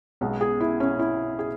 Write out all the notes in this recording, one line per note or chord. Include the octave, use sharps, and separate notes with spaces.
B1 B2 G#3
G#4
E4
C#4
E4
G#4